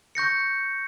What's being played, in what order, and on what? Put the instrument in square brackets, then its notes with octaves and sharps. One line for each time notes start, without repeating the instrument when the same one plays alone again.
[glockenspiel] C#6 G6 A#6 C#7